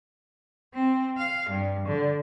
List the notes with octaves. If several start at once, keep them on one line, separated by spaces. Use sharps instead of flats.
C4
F5
G2
D3